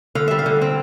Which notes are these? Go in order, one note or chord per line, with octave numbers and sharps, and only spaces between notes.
D3 F5
G3 E5
F5
D3
C4